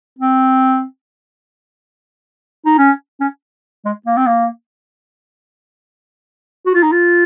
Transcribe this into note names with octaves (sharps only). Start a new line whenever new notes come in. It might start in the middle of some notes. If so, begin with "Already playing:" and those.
C4
D#4
C#4
C#4
G#3
A#3
C4
A#3
F#4
F4
D#4
F4